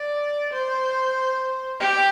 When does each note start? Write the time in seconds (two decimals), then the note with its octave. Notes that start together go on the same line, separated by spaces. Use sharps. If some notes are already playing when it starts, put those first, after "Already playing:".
Already playing: D5
0.53 C5
1.80 G4